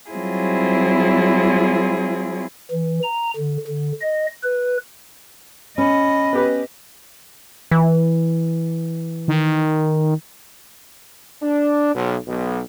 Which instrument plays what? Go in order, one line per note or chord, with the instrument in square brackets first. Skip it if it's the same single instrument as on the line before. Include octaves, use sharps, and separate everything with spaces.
[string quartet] F#3 G3 C4 E4 F4 G#4
[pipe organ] E3
A#5
D3
D3
D#5
B4
[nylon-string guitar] C#4 [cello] D#5 [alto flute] B5
[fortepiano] B3 G4 B4
[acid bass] E3
[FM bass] D#3
[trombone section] D4
B1
B1